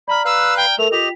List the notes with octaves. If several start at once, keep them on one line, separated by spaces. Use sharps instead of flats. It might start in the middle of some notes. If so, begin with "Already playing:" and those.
D5 A#5 B5 F6
B4 F5 E6 F#6
G5
A3 A4 A#4 F7
F4 G4 D#5 G5 B6 F7